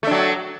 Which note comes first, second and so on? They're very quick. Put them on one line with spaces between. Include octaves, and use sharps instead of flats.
A3 D4 F#3